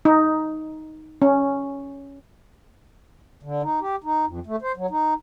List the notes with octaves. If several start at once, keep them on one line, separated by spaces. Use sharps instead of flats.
D#4
C#4
D3
D#4
G4
D#4
F2
A3
C5
F#3
D#4